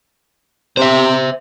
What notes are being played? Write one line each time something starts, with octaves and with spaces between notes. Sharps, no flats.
C3 C5 E5